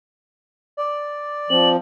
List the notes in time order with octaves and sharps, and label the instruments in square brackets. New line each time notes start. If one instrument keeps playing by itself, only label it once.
[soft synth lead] D5
[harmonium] F3 [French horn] C4 [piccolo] F#7